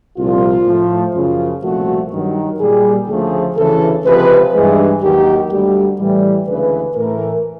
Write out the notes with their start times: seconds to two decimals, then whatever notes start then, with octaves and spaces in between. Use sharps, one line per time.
0.18 C2 A#2 F3 F4
0.66 A2 F3 A3
1.15 F#2 C#3 F3 F4
1.64 C2 A#2 F3 A3 F#4
2.12 G2 D#3 F#3
2.60 A#2 G3 G#4
3.08 D2 C#3 F3 A3 G#4
3.57 D2 C#3 E3 A4
4.05 C#2 C3 F3 G#3 B4
4.54 G2 E3 G#3 G#4
5.02 D#2 D#3 F#3 G4
5.51 D2 D3 G3 G4
6.00 A2 E3 G3
6.47 D2 C#3 E3 G#3 B4
6.96 A2 E3 A3 A#4